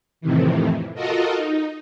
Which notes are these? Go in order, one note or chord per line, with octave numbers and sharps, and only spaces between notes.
F2 A2 C3 D#3 E3
F4 F#4 A4 A#4 D#5
D#4